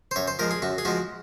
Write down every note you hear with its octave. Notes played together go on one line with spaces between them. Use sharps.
C5
F#2 C#5
C5
F3 G#3 A#4
G#4
F#2 F#4
G#4
F3 G#3 F#4